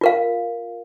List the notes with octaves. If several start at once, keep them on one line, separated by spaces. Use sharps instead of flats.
F4 A#4 F5